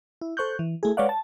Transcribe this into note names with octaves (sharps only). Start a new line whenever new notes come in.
E4
A4 C5 C#6 F#6 G6
E3
A3 E4 G#4
G#3 B4 C#5 D5 F5 F#5
A5